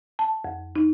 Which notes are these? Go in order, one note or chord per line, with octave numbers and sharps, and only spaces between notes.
A5
F2
D#4